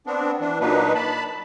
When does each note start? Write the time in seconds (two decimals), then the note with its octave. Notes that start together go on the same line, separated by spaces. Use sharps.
0.07 B3 C4 D4
0.41 E3 D4
0.61 A#2 F#3 A#3 D4 D#4 B4
0.95 A5 B5